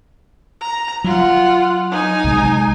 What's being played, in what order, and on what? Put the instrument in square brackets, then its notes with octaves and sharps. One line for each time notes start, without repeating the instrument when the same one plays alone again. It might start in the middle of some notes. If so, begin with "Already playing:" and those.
[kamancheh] A#5
[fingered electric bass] F#3 [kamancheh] F4 F#5
[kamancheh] D#4 G#5
[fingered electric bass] B1 C3 G#3